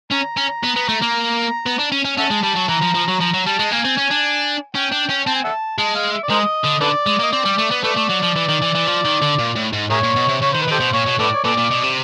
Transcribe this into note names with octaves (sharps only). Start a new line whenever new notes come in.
C#4 A#5
C#4
B3
B3
A3
A#3
B3
D4
C#4
C#4
C#4 E5 F#5 A5
G#3
G3 A5
F#3
E3 A#5
F3
F3
F#3
F3 A#5
F#3
G3 A5
G#3
A#3 G#5
C4
C#4
D4
C#4 G5
D4
C#4
C4 A5
G#5
E5 F#5 A5
G#3 A5
F5
E5
D5
G#3 A#4 C5 D#5
D3
D3 A4 B4 D5
G#3
A#3 D#5
C4 D5
G3
A3
B3
A3 A4 B4 D5
A3
F#3
F3
E3
D#3
E3
E3
F3
D#3
D3
A#2
A2
G#2
A2 G#4 A#4 C#5
A#2
B2
C3
C#3 C#5
D#3 C5
B4
D#3 G4 A4 C5
B2
A#2 C#5
B2
A2 A4 B4 D5
C#5
A#2 A4 B4 D5
A#2
B2
C3